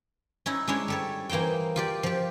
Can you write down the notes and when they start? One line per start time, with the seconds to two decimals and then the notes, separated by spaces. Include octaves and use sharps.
0.46 C#4 D#4 E4
0.67 G#3 C#4 D4 E4 C#5
0.88 G3 A4 C#5
1.29 E3 A#3 D#4 C5 G5
1.76 F4 G4 D5
2.03 F3 G4